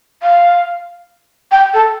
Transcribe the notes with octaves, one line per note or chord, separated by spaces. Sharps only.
F5
G5
A4